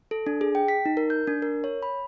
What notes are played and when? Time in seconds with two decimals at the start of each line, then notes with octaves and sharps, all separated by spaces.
0.11 A4
0.26 D4
0.41 G#4
0.55 G5
0.68 B6
0.86 D#4
0.97 A#4
1.10 G6
1.27 D4
1.42 A#4
1.64 C#5
1.82 B5